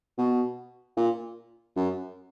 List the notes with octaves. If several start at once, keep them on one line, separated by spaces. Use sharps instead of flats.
B2
A#2
F#2